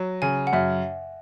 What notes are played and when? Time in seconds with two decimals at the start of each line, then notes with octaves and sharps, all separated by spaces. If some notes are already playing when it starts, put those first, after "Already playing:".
Already playing: F#3
0.22 C#3 G#5
0.47 F#5
0.53 F#2 E5